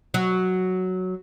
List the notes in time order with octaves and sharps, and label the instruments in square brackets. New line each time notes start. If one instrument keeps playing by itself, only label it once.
[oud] F#3